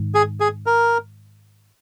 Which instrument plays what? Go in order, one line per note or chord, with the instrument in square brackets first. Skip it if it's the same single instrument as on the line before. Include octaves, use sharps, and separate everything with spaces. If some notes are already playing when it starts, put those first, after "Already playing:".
Already playing: [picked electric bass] G#2 D#3
[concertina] G#4
G#4
A#4